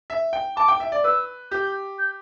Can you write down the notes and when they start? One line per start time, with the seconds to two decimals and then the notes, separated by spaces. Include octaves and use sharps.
0.10 E5
0.33 G5
0.57 A5 D6
0.68 G5
0.80 E5
0.92 D5
1.04 B4 E6
1.51 G4 G6
1.99 G6